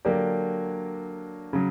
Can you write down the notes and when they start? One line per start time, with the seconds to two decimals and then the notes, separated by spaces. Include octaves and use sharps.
0.05 D3 F#3 A#3 D4 G4
1.53 C#3 F#3